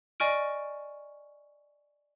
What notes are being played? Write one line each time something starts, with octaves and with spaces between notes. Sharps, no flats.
D5 D#5 G#5 C#6 F6 D7